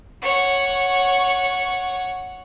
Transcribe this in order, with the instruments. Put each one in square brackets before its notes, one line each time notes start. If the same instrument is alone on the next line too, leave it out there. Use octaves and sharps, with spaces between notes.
[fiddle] C#5 F#5